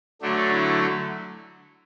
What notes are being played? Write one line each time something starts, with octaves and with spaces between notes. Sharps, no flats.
D3 F#3 A3 D4
E4